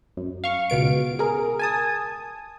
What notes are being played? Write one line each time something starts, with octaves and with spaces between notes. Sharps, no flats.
F#2
F5 C#6
C#2 B2 B3 D7
G#4 A#4
G#5 A5 D#6